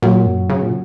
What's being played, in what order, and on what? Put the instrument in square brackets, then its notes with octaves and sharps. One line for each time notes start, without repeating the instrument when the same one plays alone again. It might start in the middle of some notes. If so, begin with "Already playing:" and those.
[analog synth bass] A#2 [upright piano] F#3
[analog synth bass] F#2
C#3
A#2